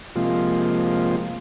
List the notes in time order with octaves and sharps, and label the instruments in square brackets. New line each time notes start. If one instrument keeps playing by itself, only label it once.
[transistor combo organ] C3 F3 G#3 A#3 F4